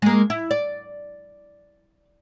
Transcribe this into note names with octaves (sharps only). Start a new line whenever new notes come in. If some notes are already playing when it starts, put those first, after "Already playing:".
G#3 A#3
E4
D5